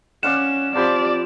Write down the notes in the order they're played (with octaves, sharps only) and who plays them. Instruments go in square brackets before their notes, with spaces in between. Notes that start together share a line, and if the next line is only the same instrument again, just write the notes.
[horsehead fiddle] C#4 [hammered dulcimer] D5 F5 F#5 [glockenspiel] E7
[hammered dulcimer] F3 C5 B5 [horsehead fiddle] C4 G4 [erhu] D5